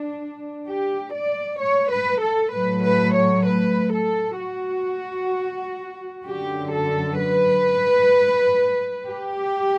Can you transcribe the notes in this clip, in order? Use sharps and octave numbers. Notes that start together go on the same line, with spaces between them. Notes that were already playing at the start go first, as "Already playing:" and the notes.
Already playing: D4
G4
D5
C#5
B4
A4
A2 F#3 A3 B4
B4
C#5
B4
A4
F#4
F#2 D3 F#3 G4
A4
B4
G4